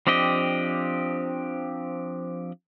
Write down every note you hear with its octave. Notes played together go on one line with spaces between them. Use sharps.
F3 C4 D4 G4 D#5